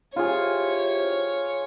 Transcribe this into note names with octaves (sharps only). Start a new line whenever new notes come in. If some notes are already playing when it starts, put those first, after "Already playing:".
E4 F4 G4 G#4 C5 C#5